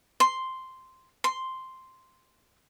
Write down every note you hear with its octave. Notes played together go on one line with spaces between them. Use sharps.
C6
C6